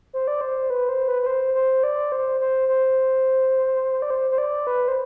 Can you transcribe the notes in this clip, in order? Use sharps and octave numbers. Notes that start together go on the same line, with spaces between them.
C5
D5
C5
B4
C5
B4
B4
C5
C5
D5
C5
C5
C5
D5
C5
C5
D5
B4
C5